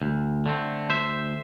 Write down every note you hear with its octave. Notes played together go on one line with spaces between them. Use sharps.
D2
D3 A3 C4
D2 C5 E5